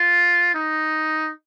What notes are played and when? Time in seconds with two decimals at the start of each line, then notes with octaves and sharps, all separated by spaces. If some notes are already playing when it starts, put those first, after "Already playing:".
Already playing: F4
0.55 D#4